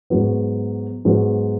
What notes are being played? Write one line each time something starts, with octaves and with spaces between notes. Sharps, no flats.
G#2 F#3 B3
G#2 F#3 B3